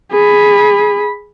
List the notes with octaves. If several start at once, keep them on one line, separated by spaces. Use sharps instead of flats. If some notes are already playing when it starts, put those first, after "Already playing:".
G#4 B5